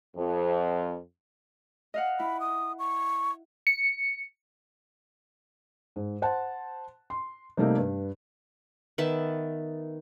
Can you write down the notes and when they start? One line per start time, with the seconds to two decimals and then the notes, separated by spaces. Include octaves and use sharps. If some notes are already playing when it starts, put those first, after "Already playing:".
0.16 F2
1.94 D#5 F5 F#5
2.20 E4 B5
2.40 D#6
2.79 C#6
3.67 C#7
5.96 G#2
6.22 C5 F#5 A5
7.10 C6
7.57 C3 G3 A3 A#3 D#4 G4
7.78 G2 B4
8.98 D#3 B3 E5 A5